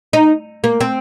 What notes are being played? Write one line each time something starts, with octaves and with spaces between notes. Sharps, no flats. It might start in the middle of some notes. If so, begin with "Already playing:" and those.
D#4
A#3
C4